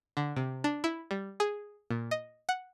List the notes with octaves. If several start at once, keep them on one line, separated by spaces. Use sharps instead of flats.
D3
C3
D4
E4
G3
G#4
A#2
D#5
F#5